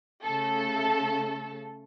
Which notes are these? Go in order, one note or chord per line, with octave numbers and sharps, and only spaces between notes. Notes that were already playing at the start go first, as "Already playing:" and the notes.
C#3 A3 A4